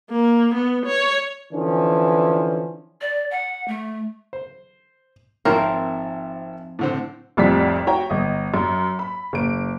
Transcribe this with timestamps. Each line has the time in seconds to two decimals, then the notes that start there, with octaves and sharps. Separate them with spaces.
0.11 A#3
0.55 B3
0.86 C#5
1.53 D3 E3 F3 C#4
3.01 D5
3.31 F#5
3.68 A3
4.33 C5
5.45 G#1 F3 C4 D#4 A#4 C#5 E5 G5
6.79 A2 D3 C4
7.37 F1 C2 F2 A2 D5 B6
7.87 F#4 C#5 G5 A#5
8.10 G1 D#5
8.54 F#2
8.99 B5
9.33 F#1 D7